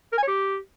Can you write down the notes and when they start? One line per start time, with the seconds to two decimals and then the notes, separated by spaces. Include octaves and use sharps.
0.13 A#4
0.18 G#5
0.23 C#5
0.28 G4